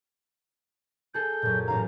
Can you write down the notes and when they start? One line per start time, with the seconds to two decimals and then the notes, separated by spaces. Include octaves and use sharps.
1.14 G#4 A4 G6
1.42 F#2 A#2
1.68 A1 F5 A#5